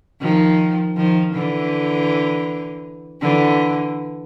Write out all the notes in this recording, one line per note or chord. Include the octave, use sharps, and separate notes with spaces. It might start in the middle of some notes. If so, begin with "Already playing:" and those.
D#3 F3
D#3 F3
D3 E3
D3 E3